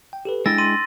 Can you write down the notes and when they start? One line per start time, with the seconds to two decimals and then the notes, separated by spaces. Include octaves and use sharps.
0.13 G5
0.25 G4 A4 B4
0.46 G#3 D4 E4 G5 E6 A6 A#6
0.58 C6 D#7